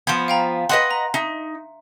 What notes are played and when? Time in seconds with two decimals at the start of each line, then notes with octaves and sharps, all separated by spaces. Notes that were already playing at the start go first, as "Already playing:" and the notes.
0.07 F3 B3 C6 G6 G#6
0.28 F5 G5 A#5
0.69 B4 D#5 F#5 C6 F#6
0.91 A#5
1.14 D#4 E5